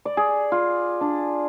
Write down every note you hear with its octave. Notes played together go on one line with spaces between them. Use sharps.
D5
G#4
F4
D4